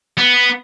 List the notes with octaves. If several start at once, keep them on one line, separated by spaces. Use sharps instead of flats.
B3